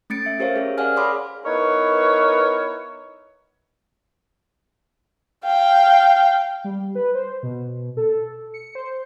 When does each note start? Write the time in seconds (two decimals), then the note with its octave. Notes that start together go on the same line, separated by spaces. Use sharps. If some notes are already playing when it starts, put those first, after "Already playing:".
0.10 A3 C#4 A6 C#7 D7
0.26 E5
0.39 C#4 G4 A#4 C5 C#5 F5
0.56 C#4 G#4
0.78 A#4 D5 F5 F#5 G#5 F6
0.96 G#4 C#5 B5 C6 D6 D#6
1.45 B3 D#4 E4 A#4 B4 C#5
5.45 F5 G5
6.64 G3
6.95 B4
7.15 C5
7.43 B2
7.97 A4
8.54 C#7
8.75 C5